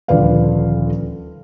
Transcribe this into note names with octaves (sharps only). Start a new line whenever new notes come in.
D#1 D2 F3 B4 D5 F5